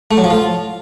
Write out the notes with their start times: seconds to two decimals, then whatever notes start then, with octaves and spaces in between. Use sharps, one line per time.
0.11 A3
0.17 F#3
0.24 F3
0.30 F4